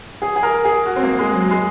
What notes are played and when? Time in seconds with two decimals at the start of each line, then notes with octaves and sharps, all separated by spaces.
0.22 G#4
0.36 G#4
0.43 A#4
0.65 G#4
0.86 F#4
0.96 C4
1.03 A#3
1.19 G#3
1.34 F#3
1.51 G#3